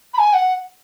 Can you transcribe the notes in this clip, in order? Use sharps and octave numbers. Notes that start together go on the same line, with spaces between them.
B5
G#5
F#5